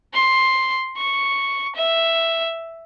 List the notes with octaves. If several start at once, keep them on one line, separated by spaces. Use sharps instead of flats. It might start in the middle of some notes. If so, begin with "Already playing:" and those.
C6
C#6
E5